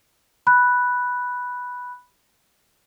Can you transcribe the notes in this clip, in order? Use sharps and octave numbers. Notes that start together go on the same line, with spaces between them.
B5 F#6